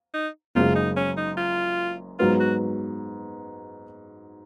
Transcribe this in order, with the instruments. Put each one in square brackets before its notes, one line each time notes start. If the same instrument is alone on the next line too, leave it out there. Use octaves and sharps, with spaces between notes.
[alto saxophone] D#4
[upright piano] F#1 F#2 C#3 G#3 [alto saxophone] F4
[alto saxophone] D#4
C#4
D#4
F4
[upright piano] G#2 F#3 B3 [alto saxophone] F4
[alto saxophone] F#4